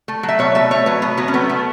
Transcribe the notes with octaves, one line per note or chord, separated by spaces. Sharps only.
A3
F#3
E5
B2 C#5
A3 E5
A3 C#5
F#3 B4
B2 B3
F#3 B3
C#4
A3 B3
A3